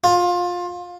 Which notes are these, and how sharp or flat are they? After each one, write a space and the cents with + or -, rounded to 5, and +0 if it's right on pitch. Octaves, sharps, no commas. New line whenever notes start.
F4 +20